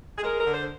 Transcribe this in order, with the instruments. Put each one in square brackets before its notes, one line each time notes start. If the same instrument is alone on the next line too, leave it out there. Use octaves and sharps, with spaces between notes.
[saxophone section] G#4
G#3 A#4
A#4
D3
C5